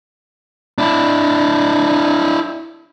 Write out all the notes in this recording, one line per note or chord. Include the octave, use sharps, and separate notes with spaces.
D4 E4